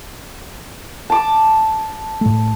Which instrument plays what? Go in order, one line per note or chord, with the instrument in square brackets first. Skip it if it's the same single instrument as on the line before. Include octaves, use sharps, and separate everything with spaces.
[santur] A5 D6
[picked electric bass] A2 A3